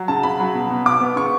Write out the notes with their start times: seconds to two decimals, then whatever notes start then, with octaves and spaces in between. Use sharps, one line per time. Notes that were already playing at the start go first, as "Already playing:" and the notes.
Already playing: F#3
0.08 C#3 A5
0.23 C#3 B5
0.40 F#3
0.55 B2
0.70 B2
0.85 B2 D6
1.01 B3
1.16 C#3 C#6